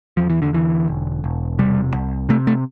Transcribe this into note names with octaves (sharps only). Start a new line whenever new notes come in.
E2 F3
E3
D3
D3 E3
E1
E1
C3 G3
C2
C3 A3
A3